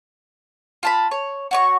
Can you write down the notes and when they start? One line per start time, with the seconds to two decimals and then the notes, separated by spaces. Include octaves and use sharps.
0.83 F4 A5 B5
1.11 C#5
1.51 F#4 C#5 C#6